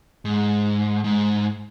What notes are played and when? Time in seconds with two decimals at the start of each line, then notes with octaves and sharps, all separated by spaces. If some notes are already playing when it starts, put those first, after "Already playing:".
0.25 G#2
1.04 G#2